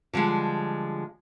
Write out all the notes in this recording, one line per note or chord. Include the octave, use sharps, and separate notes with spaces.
D3 F3 G3 G#3